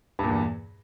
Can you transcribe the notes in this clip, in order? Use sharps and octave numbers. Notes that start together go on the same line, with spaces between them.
E2 G2 A#2